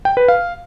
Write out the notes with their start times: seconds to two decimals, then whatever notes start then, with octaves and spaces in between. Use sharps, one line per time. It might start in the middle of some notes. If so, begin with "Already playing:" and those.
0.05 G5
0.17 B4
0.28 F5